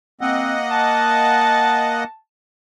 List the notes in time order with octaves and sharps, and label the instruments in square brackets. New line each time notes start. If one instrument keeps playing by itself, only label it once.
[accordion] A#3 D#5 F#5 [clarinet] C4
[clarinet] A5